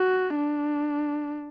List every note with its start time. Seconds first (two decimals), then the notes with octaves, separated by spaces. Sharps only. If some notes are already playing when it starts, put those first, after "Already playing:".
Already playing: F#4
0.36 D4